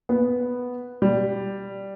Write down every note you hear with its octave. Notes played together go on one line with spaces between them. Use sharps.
B3
G3